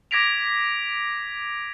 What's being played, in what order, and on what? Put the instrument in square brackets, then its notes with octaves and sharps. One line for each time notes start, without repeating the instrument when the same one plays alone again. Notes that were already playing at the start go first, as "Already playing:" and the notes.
[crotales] D6 G#6 A#6 B6 D7 F7